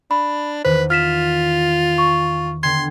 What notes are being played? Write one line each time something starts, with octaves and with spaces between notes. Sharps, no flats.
D4 B5
E2 D#3 B4 C5
F4 F6 B6 E7
C#6
D3 B3 G5 C6 G#6